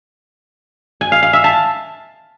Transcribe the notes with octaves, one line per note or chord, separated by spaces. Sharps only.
G#5
F5
F5
E5
A5